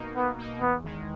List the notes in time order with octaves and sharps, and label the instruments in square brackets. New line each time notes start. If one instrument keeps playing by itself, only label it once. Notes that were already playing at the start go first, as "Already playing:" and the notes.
Already playing: [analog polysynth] B2 A#3 D#4
[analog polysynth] B2 [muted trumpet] B3
[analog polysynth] A#3 D#4
[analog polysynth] E2 [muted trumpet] B3
[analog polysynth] D#3 G#3